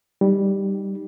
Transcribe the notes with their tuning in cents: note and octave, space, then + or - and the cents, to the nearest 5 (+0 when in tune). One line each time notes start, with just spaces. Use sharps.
G3 +0 D#4 -5